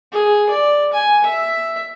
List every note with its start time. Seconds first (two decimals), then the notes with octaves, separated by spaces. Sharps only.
0.13 G#4
0.50 D5
0.93 G#5
1.24 E5